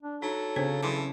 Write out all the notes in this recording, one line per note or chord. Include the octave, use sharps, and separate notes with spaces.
D4
F#3 D#4 A4
C#3 C4 D4 C5
C#3 E3 F#3 C6 D6